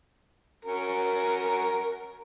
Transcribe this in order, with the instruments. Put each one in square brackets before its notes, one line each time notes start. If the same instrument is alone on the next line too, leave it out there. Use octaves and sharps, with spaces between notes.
[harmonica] C#4 F#4 A#4